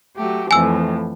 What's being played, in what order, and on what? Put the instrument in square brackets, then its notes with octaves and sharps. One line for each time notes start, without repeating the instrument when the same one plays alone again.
[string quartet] F#3 A3 G4
[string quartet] F2 A2 E3 [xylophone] G#5 E6